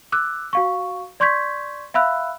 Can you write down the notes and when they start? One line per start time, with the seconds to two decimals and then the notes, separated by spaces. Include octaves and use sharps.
0.12 D6 E6 F#6
0.53 F#4 F5 C#6
1.20 D5 C6 C#6 G6 G#6 B6
1.94 E5 F5 B5 E6 F#6